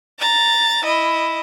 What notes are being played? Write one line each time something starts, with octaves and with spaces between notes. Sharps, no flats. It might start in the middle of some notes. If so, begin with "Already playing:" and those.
A#5 A6
E4 D#5